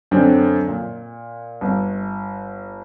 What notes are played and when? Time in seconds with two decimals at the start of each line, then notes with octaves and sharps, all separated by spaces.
0.11 F#2 D3 C4 D4
0.68 A#2
1.61 G1